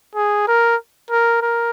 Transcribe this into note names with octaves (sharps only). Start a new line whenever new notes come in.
G#4
A#4
A#4
A#4